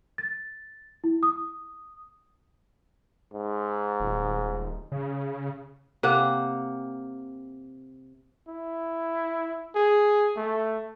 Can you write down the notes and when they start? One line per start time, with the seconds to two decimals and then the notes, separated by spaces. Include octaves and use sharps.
0.18 A6
1.04 E4
1.23 D#6
3.34 G#2
4.00 D#1
4.92 C#3
6.03 C3 A#3 F#5
8.48 E4
9.76 G#4
10.37 A3